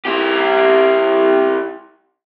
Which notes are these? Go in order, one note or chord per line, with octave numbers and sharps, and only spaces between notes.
E4 G4